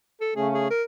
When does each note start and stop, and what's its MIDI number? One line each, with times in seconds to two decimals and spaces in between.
0.21 0.32 69
0.36 0.68 49
0.36 0.68 57
0.36 0.68 61
0.36 0.48 68
0.54 0.67 68
0.71 0.83 70